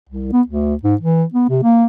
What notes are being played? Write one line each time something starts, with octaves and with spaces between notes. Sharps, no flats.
C2
B3
D2
G#2
E3
B3
C3
A#3